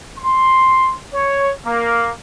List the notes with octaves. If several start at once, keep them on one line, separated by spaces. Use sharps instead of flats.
C6
C#5
A#3